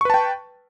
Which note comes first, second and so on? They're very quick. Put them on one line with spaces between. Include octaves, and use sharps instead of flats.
C#6 B4 A5 G5